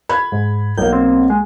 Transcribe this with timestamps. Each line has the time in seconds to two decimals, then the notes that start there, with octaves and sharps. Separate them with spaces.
0.09 B5 G#6
0.32 G#2
0.78 B1 A#3 G6
0.93 C4
1.30 G#3